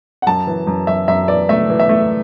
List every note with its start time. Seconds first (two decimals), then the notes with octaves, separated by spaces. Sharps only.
0.22 F#5
0.27 F#2 A5
0.47 E3
0.67 F#2
0.87 F#2 E5
1.08 F#2 E5
1.28 E3 D5
1.49 A3 E5
1.70 E3
1.79 E5
1.89 A3